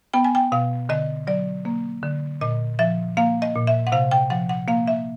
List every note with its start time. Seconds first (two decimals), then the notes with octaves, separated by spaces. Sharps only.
0.14 B3 G5
0.24 G#5
0.35 G5
0.52 B2 F5
0.89 D3 D#5
1.27 F#3 D5
1.65 A#3
2.03 D3
2.41 A#2 D#5
2.79 F3 E5
3.17 A#3 F5
3.42 D#5
3.55 A#2
3.67 E5
3.87 F#5
3.92 C3 F5
4.11 G5
4.30 F3 F#5
4.49 F#5
4.68 A#3 F5
4.88 E5